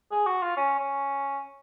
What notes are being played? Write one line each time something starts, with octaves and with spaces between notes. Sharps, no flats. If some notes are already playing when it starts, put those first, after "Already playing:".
G#4
F#4
F4
C#4
C#4